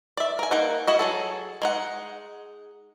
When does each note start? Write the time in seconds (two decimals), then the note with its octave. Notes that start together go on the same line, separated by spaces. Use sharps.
0.17 D5 E5
0.39 A#4 G#5
0.51 A#3 D#4 F#5
0.87 E4 F#4 D#5
0.99 F#3 G#4 A4
1.62 G#3 D#4 F#5